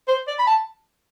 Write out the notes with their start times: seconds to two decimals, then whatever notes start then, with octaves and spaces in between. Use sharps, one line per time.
0.08 C5
0.27 D5
0.39 B5
0.47 A5